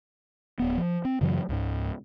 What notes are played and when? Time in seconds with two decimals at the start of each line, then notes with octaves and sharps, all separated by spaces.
0.59 D1 B3
0.77 F3
1.05 C4
1.21 F#2 C#3 E3 F#3
1.49 C#2 G#2